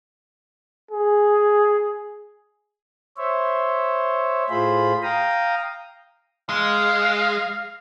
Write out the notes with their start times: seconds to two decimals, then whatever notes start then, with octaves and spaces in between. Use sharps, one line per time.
0.91 G#4
3.17 C5 C#5 E5
4.50 A2 F4 G#4 C5 B5
5.03 F5 G5 A#5 D#6
6.49 G#3 F5